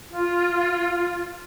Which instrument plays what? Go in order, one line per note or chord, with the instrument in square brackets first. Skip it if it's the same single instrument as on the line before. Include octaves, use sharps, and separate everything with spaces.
[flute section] F4